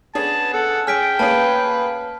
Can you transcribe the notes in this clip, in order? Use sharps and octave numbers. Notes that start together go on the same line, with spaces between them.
B3 C#4 D4 G#4 A5
A4 F#5
C#4 G#4 G5 F6 B6 D7
A#3 C#4 G#4 B4 A5